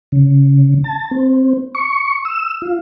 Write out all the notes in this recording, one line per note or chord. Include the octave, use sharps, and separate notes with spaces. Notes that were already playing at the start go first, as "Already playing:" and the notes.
C#3
A5
C4
C#6
E6
F4